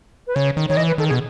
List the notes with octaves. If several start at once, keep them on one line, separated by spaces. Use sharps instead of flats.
B4
C#3 C#5
D#3
D#3 C#5
E3 D#5
B4
D#3 A4
G#4
B2